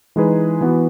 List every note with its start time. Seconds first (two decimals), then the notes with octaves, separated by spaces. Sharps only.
0.16 E3 G#3 D#4 G#4 B4
0.61 E3 B3 F#4